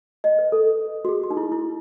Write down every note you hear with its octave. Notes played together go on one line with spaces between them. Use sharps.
D#5
B4
A4
F#4
G#4
F#4
D#4
E4
E4